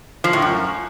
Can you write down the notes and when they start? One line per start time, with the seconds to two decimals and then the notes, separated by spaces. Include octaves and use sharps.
0.24 F3
0.33 A2
0.42 F#2